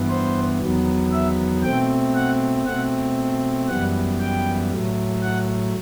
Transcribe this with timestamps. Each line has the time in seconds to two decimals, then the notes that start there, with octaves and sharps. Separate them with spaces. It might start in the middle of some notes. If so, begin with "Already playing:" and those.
Already playing: G2 E3 B3
0.09 C5
0.61 E2 D#3 F#3 B3
1.11 E5
1.63 B2 A3 C4 G5
2.14 F#5
2.66 B2 A3 C4 F#5
3.68 F#2 E3 G3 B3 F#5
4.20 G5
4.71 A2 F#3 A3
5.22 F#5